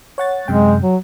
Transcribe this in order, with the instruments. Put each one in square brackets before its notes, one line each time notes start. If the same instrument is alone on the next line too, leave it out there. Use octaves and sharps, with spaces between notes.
[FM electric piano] C#5 F#5 A6
[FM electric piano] F#2 C3 G5 [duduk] G#3
[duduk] F#3